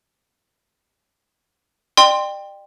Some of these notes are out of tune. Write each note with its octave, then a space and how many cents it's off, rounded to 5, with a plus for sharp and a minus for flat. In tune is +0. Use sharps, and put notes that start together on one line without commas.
D5 +40 G5 +10 C6 +0